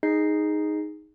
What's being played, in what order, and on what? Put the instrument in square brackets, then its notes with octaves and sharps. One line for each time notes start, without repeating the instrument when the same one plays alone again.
[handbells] D#4 G#4 D#5 G6 C7